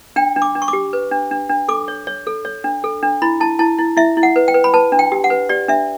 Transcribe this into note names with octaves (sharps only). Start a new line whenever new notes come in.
D4 G5
D4
D6
D4
C#6
D6
G4
B4
D4
D4
D4
A4 D6
C#5
C#5
A4
C#5
D4
A4
D4
E4 B5
E4 A5
E4 A5
E4
E4 E5
E4
F#5
B4
G5
B4
B5
B4 A5
D4
G5
G4
F#5
B4
G4 D5
D4 E5